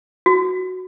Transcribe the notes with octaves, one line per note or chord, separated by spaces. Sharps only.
F#4